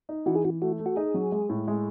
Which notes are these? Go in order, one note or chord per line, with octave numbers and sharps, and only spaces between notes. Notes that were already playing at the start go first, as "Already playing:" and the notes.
D#4
E3 F#4
G#4
E3 F#4
A3 F#4
A3
F#4
D#4 G#4
F#3
G#3
A2
G#3